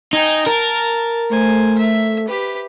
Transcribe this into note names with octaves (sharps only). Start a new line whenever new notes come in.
D#4 G5 G#5
A#4 A5
A3 C5 G#5
E5
G4 B4